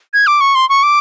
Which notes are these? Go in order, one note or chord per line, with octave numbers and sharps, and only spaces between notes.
G#6
D6
C#6
C6
C#6
D6